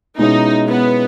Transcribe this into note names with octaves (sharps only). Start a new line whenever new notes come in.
B2 G#3 C#4 D#4 E4
B3